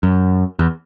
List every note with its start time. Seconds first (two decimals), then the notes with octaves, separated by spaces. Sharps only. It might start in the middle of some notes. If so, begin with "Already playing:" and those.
0.03 F#2
0.59 E2